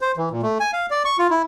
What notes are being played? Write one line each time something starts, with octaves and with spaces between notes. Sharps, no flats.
C5
E3
A#2
A3
G#5
F5
D5
C#6
F4
E4